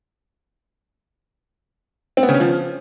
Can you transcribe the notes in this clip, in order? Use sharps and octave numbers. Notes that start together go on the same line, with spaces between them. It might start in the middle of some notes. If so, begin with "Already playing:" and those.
C4
B3
C#3
C#4
F3